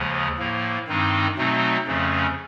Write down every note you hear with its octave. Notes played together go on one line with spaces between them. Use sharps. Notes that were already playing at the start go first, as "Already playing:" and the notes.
Already playing: D#2 C#3 F3 G#3
A2 F3 A#3
G2 D#3 G#3 C4 D#4
B2 F#3 A3 C4 D#4
F2 C#3 F3 A3 C#4